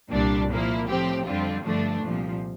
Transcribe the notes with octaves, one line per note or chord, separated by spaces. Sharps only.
C2 A#2 G3 D4
A#2 F3 A#3 E4
A2 F3 C4 G4
F2 D3 G3 C4 F4
G2 D3 F3 A3 D4
C2 A#2 F3